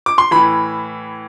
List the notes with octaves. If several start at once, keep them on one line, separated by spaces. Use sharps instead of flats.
D6
C6
A2 E3 B5